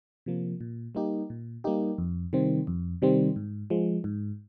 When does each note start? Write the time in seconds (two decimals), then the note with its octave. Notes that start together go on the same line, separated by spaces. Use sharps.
0.26 C3 F3 A#3
0.61 A#2
0.95 G3 A#3 D#4 G4
1.30 A#2
1.64 G3 A#3 D#4 G4
1.98 F2
2.33 C3 D#3 G3 C4
2.67 F2
3.02 C3 D#3 G3 C4
3.36 G#2
3.70 F3 G#3
4.04 G#2